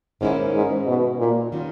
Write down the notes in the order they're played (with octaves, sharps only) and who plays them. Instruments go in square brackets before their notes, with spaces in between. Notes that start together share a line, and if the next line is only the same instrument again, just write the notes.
[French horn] G#2 [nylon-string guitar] D#3 A#3 C#4 E4
[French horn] G#2
B2
A#2
[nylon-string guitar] D#3 G3 C#4